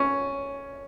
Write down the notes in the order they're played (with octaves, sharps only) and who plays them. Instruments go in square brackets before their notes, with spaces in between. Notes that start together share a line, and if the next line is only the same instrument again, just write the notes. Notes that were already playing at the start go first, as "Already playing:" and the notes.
Already playing: [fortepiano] C#4